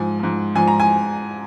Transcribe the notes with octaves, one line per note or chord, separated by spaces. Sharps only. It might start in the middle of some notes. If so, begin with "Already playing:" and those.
Already playing: G#2 F3 G#5
G#2 F3
G#2 F3 G#5
A#5
G#5